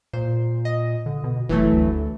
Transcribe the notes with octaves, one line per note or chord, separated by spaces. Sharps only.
A#2 C5
D#5
D3
B2
F#1 E3 F#3 A3
D2